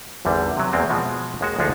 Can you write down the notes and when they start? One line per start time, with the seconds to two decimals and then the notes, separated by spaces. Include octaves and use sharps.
0.25 G#1 E2 D3 G3
0.57 C3 F#3
0.73 E2 G#3 A#3 C4
0.90 B2 F3 G#3
1.41 D#2 G#3 F#4
1.59 D2 F3 G#3 D4 D#4 A#5